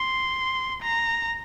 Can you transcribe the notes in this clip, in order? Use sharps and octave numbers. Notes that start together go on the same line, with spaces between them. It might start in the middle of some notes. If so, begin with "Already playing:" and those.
Already playing: C6
A#5